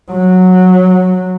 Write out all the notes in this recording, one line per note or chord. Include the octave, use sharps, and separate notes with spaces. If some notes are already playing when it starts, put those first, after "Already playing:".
F#3